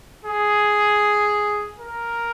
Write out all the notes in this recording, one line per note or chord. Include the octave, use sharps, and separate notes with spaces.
G#4
A#4